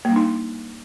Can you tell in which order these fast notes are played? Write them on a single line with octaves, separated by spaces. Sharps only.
A#3 G3 D4 D#4